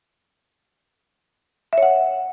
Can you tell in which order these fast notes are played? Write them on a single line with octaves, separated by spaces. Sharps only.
E5 C#5 F#5